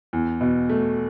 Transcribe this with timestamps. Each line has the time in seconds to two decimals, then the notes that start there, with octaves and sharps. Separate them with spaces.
0.13 E2
0.41 B2
0.69 A3